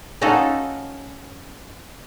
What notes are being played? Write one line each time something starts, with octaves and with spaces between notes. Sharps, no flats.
C#4 D#4 F4 F#4 A4